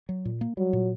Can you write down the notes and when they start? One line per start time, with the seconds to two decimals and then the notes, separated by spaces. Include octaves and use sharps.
0.09 F#3
0.25 A#2
0.41 A#3
0.57 F#3 G3
0.73 A#2